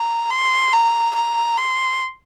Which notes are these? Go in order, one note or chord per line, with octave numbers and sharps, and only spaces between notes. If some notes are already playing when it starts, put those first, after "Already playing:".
Already playing: A#5
C6
A#5
A#5
C6